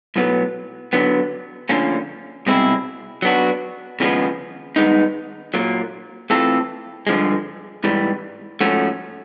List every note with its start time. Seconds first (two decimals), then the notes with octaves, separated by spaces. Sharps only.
0.16 B1 A2 F#3 B3
0.93 D3 F#3 B3
1.69 D2 D3 F3 A#3 C#4
2.47 C2 B2 G#3 C4 E4
3.22 F#3 B3 D4 F#4
4.00 D#2 C#3 F3 G#3 B3
4.76 G2 D#3 G#3 B3 D#4
5.54 A#2 F#3 A#3
6.30 E3 A3 C4 F4 A4
7.07 G2 D3 F3 G#3
7.84 G#2 E3 G3
8.61 G#2 F3 A3 C#4 F#4